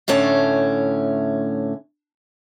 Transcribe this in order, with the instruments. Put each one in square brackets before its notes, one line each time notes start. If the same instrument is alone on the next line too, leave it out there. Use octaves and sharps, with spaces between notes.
[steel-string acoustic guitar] A2 D3 A3 C#4